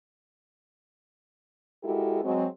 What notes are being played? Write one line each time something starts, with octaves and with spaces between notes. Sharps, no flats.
G#3 E4 F#4 G4 A4 A#4
F#3 G#3 C4